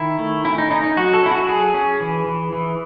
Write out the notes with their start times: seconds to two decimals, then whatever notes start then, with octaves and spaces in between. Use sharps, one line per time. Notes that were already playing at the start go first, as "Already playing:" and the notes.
Already playing: D#3 E4
0.19 A3
0.45 C#4 E4
0.58 D#4
0.71 C#4 D#4
0.84 D#4
0.97 F#3 F#4
1.14 A4
1.23 C#4 E4
1.31 F#4
1.49 F#3 G#4
1.74 C#4
2.00 E3
2.26 E3
2.53 E3